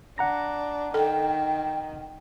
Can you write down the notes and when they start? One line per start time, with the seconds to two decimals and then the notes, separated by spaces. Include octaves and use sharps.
0.18 D4 F#5 A#5 A#6
0.94 D#3 A4 G5